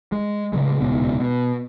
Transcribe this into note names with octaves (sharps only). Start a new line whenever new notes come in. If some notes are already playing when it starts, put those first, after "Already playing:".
G#3
A2 C#3 F#3 G#3
D#1 C#2 G#2 B2
B2